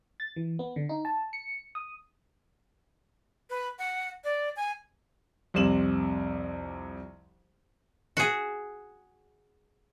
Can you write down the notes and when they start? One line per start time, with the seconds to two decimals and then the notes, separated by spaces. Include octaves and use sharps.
0.20 A6
0.36 E3
0.59 B3
0.76 D3
0.89 D#4
1.05 A5
1.33 C#7
1.75 D#6
3.50 B4
3.79 F#5
4.24 D5
4.56 G#5
5.54 C2 F2 C3 E7 F#7
8.17 F#4 G#4